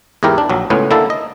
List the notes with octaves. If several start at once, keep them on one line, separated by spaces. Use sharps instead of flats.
E2 G#2 E4 G4 A#4
D4
A#1 F#3
C#2 A2 B3 C#4
D3 A#3 E4 A4
D#5